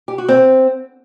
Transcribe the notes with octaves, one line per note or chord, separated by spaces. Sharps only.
G4
F#4
C4